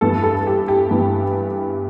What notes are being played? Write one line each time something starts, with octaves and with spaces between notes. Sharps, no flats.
G2 E3 B3 A4
A4
G4
G4
G2 E3 B3